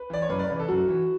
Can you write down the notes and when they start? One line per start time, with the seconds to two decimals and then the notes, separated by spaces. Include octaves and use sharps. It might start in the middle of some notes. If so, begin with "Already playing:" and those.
Already playing: B4
0.10 E3 D5
0.22 C#5
0.29 F#2 B4
0.39 D5
0.50 C#3 E3 B4
0.59 A4
0.68 F#2 F#4
0.88 E3